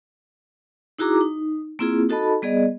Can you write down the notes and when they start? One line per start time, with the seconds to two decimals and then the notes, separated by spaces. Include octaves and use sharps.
0.98 D#4 E4 F#4 G#4 A#5 D6
1.21 D#4
1.79 A#3 C4 E4 F4 G#4
2.09 D#4 F#4 A4 D#5 A5 B5
2.42 G3 B3 G#4 D5 D#5